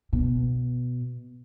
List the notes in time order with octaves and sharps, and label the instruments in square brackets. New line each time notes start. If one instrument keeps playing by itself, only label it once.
[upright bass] B2